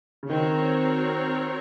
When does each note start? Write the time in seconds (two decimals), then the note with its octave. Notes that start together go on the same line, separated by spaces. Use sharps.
0.23 C#3
0.29 D#3 C4 F#4 A#4 C#5